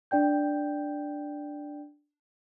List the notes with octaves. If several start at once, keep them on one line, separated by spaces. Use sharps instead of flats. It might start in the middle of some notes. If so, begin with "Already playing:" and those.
D4 D5 G5 G6